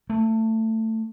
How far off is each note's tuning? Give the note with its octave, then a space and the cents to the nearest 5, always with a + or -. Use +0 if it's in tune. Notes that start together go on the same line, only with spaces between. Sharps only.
A3 +20